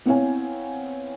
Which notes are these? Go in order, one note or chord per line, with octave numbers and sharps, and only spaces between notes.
B3 C4 E4 C#5 F5 G#5